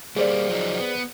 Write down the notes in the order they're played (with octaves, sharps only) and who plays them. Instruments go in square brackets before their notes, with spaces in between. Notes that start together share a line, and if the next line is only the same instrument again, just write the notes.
[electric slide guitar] G3 A#3 [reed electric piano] G#4 C5 D5
[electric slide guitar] F3 F#3 D#4
B3